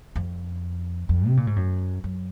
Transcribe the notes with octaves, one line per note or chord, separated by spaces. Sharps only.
F2
F2
C3
A#2
G#2
F#2
F#2